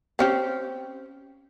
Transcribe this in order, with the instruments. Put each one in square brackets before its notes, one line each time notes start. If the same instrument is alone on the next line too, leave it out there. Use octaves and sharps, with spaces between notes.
[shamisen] C4 C#4 G4